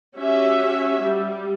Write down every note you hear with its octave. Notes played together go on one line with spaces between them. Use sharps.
C#4 F#4 G4 E5
G3